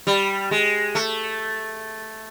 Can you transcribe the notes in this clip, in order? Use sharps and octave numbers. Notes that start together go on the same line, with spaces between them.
G3
G#3
A3